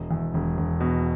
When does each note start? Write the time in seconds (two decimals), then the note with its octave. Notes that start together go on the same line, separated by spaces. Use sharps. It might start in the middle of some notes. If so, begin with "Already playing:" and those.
Already playing: E1
0.11 E2
0.34 E1
0.57 E1
0.80 B2